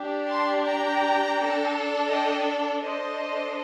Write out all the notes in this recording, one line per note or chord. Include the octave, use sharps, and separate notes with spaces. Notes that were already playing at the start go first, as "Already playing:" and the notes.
Already playing: D4 G4
A5 C6
G5 A#5
D4 A4
D#5 G5
D4 A4 C5 D#5